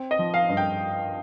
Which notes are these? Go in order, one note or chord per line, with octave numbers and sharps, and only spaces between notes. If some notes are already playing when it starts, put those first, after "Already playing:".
Already playing: C4
D#5
F3
F5
G2
G5